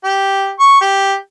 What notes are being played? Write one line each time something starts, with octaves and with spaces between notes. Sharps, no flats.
G4
C#6
G4